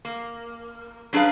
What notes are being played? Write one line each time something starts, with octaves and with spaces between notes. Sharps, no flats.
A#3
F#3 D4 G#4 B4 F5